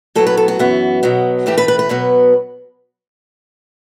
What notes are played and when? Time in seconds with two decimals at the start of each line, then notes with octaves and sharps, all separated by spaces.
0.15 A2 F#3 B3 A4
0.27 B4
0.37 A4
0.48 F#4
0.59 F#2 E3 B3
1.03 B2 F#3 B3
1.46 A2 E3 A3 G4
1.58 B4
1.68 B4
1.79 B4
1.89 B2 F#3 B3